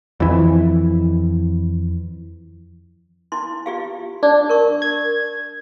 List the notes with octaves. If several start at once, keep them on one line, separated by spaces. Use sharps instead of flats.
F2 E3
E4 C6
F4 G4 F5
D4 D5
A#4 C#6
G#6